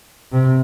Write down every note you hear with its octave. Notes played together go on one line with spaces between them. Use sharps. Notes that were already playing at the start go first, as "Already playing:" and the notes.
C3